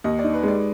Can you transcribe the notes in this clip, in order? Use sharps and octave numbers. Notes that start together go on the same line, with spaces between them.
D#2 D#5
D5
D#4
B4
G#3 D5